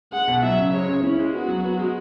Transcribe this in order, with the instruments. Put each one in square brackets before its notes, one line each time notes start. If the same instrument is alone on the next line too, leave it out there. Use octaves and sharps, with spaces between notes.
[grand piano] G#3 [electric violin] F#5
[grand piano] B2
[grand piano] F#3 [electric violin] E5
[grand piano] C#3
[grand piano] G#3 [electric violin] C#5
[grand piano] C#3
[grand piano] C#4 [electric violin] E4
[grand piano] G#3
[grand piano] B3 [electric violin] F#4
[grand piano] F#3
B3
G#3